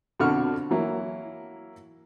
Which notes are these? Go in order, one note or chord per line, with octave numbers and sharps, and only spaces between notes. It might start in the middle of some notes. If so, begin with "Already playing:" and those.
F2 B2 D3 F#4 C#6 F6
E3 F#3 A#3 E4